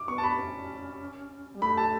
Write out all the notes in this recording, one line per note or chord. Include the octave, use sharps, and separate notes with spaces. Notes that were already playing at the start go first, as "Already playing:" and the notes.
Already playing: D6
B3 C#6
A5
B5
C#4
G3
A3 B5
A5